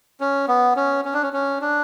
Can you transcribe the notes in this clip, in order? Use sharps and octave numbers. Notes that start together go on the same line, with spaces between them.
C#4
B3
C#4
C#4
D4
C#4
C#4
D4